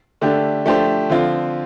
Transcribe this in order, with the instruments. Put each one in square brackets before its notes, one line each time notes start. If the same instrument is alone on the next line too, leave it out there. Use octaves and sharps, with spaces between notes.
[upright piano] D3 A3 D4 G4
F3 A3 D4 G4 C5
D3 F3 C4 F4